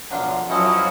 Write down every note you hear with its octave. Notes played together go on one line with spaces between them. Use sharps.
B2 D3 F3 F#3 D4 F4
F3 F#3 C#4 E4 F#4 A4 D#5 E5